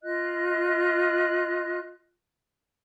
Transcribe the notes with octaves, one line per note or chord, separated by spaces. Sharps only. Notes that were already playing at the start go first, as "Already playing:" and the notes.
F4 D#5 F#6